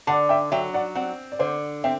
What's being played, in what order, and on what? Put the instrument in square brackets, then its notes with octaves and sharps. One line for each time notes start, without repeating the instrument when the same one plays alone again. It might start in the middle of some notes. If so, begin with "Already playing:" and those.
[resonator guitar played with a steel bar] D3 [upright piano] F#5 A5
[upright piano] E5 G5
[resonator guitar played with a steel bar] F#3 [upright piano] E5 G5
[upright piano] D5 F#5
[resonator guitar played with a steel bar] C4 [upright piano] D5 F#5
[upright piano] D5
[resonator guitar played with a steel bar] D3 [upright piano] C5
[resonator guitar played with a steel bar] C4 [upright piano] E5 G5